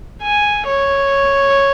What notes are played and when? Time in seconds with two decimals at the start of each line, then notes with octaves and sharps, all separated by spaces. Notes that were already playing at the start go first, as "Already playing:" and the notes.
0.22 G#5
0.66 C#5